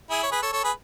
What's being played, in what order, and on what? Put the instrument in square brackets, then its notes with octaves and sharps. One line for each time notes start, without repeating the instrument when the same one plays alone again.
[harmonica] E4 G#4
C#5
G#4 B4
A4 C#5
A4 C#5
G#4 B4